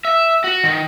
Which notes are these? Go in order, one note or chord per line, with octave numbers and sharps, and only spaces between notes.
E5
F#4
D#3